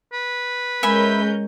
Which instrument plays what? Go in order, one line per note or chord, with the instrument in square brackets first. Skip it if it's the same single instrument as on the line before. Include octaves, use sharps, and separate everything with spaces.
[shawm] B4
[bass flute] G#3 [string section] C#4 A#4 G6 [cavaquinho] E5 G#5 B5